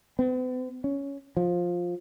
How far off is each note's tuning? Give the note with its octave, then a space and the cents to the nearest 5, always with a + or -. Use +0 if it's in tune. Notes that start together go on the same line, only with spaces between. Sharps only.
B3 +45
C#4 +10
F3 +10